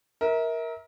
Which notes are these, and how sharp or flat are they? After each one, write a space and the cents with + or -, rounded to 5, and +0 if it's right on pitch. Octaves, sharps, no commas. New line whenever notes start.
A#4 +10 E5 -35